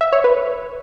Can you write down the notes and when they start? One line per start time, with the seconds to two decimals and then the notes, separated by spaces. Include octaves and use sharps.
0.01 E5
0.12 C#5
0.24 B4